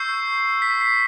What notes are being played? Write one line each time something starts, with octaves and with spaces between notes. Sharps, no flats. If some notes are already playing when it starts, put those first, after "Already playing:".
Already playing: C#6 E6 G6 C7
B6
C7